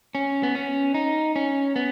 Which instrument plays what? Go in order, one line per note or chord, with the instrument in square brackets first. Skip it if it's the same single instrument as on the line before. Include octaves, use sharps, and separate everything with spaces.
[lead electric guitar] C#4
B3
C#4
D#4
C#4
B3